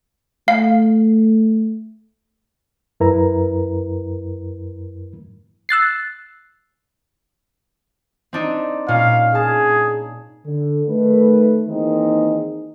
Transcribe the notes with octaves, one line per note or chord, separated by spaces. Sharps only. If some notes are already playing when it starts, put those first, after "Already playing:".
A3 F5
F#2 E4 A#4 B4 A#5
E6 F#6 A6 C7
C4 D4 D#4
A#2 C#4 F5
G#4 A5
D3
D#3 A3 B4
D#3 E3 A#3 C4 D#4 G#4